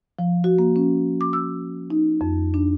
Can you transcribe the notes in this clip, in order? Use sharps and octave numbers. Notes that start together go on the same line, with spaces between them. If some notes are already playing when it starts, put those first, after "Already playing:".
F3
F#4
A#3
C#4
D6
E6
D#4
F2
D4